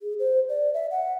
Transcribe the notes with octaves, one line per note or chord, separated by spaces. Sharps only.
G#4
C5
D5
E5
F#5